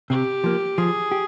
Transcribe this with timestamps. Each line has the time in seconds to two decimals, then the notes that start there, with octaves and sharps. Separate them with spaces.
0.10 C3 G4
0.44 F3 A#3
0.78 F3 G#4
1.12 G4